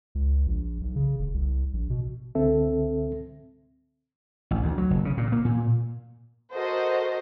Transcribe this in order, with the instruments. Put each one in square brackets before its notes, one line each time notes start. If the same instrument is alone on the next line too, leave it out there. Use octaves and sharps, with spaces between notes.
[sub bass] C#2
A#1
B1
C#3
F1
C2
A#1
B2
[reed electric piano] C#2 D3 C4 A4 E5
[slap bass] A1
D2
F#3
F#1
C#3
A#2
A#3
A#2
[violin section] F#4 A4 A#4 C5 D#5